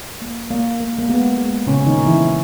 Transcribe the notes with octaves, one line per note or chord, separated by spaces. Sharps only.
A#3
A#3
A#3
A#3
G#3 B3
G#3
A#2 C#3 C#4
C#4
D#3 D#4
A#2
E3 E4
D#3